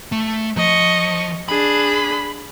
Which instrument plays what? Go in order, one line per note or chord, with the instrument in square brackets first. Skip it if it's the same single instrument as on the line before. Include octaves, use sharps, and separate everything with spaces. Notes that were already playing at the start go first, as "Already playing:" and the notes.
[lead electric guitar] A3
[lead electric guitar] F3 [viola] D#5 C#6
[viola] D4 G#4 [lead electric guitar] B5